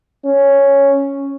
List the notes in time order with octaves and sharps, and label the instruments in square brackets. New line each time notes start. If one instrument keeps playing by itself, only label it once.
[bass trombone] C#4